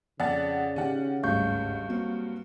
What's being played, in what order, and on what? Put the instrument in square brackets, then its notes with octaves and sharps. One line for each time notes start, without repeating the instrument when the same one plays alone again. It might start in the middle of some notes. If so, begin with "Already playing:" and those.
[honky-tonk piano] F2 F#5 A6 [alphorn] C#3 [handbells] D5
[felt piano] D#3 [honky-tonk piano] C#4 G4 F#5
[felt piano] G#1 D2 [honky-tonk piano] G2 [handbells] F5 C#6 G6
[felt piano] F#3 A#3 C4